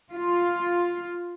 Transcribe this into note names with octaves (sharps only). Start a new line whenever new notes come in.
F4